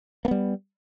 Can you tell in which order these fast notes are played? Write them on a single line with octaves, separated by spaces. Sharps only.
A#3 B3 G3